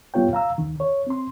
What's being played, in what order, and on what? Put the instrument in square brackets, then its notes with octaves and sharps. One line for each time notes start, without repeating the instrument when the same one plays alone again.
[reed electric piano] G2 G3 B3 F4 C#5 G5
F5 A#5 E6
D2 D#3
C#5
C4 C6